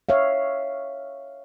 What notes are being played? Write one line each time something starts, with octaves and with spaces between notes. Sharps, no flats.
C#5 E5 F5